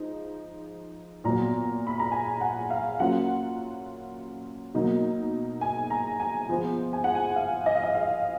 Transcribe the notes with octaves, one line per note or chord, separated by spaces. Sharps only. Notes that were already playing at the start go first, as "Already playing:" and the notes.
Already playing: F3 G#3 D#4
A#2 F#3 B3 A#5
B5
A#5
G#5
F#5
F5
F#3 A#3 C#4 F4 F#5
B2 F#3 A#3 D#4
G#5
A#5
G#5
F3 G#3 B3 F4
G#5
F#5
G#5
F5
D#5
F5
D#5
F5